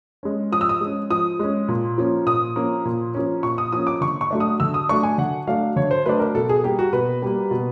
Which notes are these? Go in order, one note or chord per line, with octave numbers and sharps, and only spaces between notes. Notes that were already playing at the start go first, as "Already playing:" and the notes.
G#3 C#4
F3 D#6
E6
D#6
G#3 C#4
F3 D#6
G#3 C#4
A#2
F3 A#3 C#4
A#2 D#6
F3 A#3 C#4
A#2
F3 A#3 C#4
A#2 C#6
D#6
F3 A#3 C#4 D#6
D6
D3 C#6
C#6
F#3 A3 D4
D#6
D3 E6
D#6
F#3 A3 D4 C#6
G#5
D3 F#5
F#3 A3 D4 F5
D3 C#5
C5
F#3 A3 D4 B4
A#4
B2 A4
G#4
G3 A#3 G4
F#4
B2 B4
G3 A#3
B2